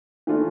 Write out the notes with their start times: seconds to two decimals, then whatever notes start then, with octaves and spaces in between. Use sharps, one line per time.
0.27 E3 A3 D4 F4